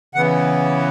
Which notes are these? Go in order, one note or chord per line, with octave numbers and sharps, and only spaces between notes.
C#3 E3 B3 F#5